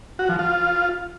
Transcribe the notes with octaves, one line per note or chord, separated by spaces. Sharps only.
F#4
F3
F4